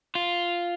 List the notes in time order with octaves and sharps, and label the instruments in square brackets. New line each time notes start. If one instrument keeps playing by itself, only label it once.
[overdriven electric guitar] F4